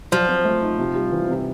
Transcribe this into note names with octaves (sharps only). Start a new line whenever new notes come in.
F3 F#3
C4
A3
D#4
C3
G3
E3
C3